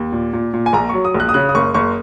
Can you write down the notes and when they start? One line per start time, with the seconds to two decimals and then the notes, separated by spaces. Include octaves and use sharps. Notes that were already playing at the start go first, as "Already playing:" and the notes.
Already playing: D#2
0.12 A#2
0.33 A#2
0.54 A#2
0.66 G#5
0.73 A#1 A#5
0.89 F#3 C#6
1.05 D#6
1.15 A#1
1.20 F#6
1.29 D#6
1.34 C#3 F#6
1.49 D#6
1.55 F#1 C#6
1.74 F#1 C#6